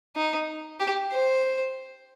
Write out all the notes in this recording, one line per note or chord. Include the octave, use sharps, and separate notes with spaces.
D#4
G4
C5